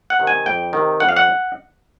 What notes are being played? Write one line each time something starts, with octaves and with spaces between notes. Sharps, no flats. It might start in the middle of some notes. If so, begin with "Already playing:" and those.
F#5
C3 D#3
G#5
F2 G5
C3 D#3
F2 F#5
F5
F#5